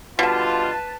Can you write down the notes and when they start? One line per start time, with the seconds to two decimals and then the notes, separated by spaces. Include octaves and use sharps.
0.19 B2 D3 G3 F4 B4 A5